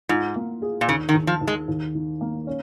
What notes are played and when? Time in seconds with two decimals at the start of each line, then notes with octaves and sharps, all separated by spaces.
0.09 G#2 F4
0.36 A#3
0.62 G#4
0.81 A#2
0.88 D#2 C#3
1.09 D#3
1.14 D#2
1.27 F3
1.41 D#2
1.47 G#3
1.68 D#2
1.94 D#3
2.21 A#3
2.47 C#4